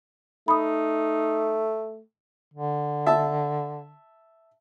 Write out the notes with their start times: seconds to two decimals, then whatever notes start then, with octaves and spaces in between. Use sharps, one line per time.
0.48 A3 D#4 B5 D#6
2.54 D3
3.06 E5 A5